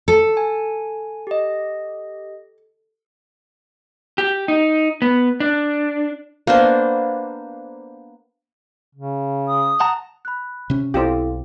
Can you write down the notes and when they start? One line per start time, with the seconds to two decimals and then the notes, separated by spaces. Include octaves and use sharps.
0.08 A4
0.37 G#5
1.27 G4 D#5
4.18 G4
4.48 D#4
5.02 B3
5.40 D4
6.47 A#3 B3 D4 C5
8.95 C#3
9.48 D#6
9.80 F#5 A5 A#5
10.25 B5 F#6
10.70 C3 C#4
10.94 B1 C4 E4 F4 G4 A4 F5